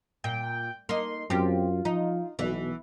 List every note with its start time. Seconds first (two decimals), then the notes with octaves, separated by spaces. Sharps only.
0.24 A#2 G5
0.89 A#3 D#4 C6
1.30 F#2 C4 F4 G4
1.85 F3 D#4
2.39 B1 B2 E3